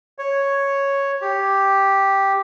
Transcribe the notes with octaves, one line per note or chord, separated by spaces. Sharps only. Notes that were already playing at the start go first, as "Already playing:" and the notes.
C#5
G4